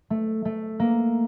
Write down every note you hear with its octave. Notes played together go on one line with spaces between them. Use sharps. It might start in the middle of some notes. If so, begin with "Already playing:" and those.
A3
A3
A#3